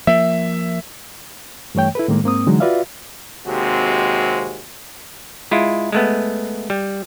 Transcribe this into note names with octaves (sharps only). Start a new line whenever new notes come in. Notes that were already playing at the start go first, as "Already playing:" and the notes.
F3 A#3 E5
G2 E3 A3 C#5 G5
E4 A4 B4
A2 D#3 G#3 A#3
G#2 A#3 C4 D#6
D3 E3 F#3 G#3 D#4
F4 F#4 B4 D5 E5 F5
D#2 C3 G#3 C4 F#4
G#3 E4 F4
G#3 A3 B3
G3